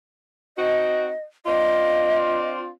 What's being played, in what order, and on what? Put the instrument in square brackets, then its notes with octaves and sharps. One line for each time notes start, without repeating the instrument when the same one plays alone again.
[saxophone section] C4 D#4 F#4 [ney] D#5
[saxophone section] C4 D4 F4 [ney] D#5